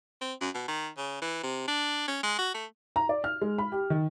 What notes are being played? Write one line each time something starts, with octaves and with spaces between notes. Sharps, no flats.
C4
F#2
B2
D#3
C#3
E3
C3
D4
C#4
G#3
F#4
A3
A#5
D5
F6
G#3
B5
G4
D#3